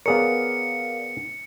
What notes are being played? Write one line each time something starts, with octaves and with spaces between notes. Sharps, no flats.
B3 G#4 A#4 C#5 D5 F5 C#7